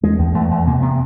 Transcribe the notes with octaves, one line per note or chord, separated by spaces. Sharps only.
E2 G#3
E2
E2 A3
E2
C3 A#3
C3 B3